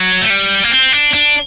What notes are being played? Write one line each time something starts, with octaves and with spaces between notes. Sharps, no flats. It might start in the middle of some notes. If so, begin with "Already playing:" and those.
Already playing: F#3
A3
G3
A#3
C4
D4
D4